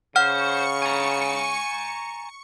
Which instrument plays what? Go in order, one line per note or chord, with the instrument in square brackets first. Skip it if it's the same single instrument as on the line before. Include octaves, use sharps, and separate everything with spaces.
[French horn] C#3 [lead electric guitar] C5 [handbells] F#5 F6 [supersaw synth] C#6 C#7
[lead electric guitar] G#5 A#5